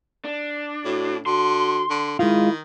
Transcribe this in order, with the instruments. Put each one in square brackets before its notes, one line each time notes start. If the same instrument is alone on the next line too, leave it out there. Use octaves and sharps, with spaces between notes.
[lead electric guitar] D4
[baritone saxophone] A2 [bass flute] F#4
[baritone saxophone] D3 [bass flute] F#4 [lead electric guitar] C6
[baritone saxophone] D3
[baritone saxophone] D#3 [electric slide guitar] G#3 F4 [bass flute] E4